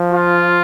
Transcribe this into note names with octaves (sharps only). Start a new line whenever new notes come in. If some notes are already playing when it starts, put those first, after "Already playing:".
Already playing: F3
F4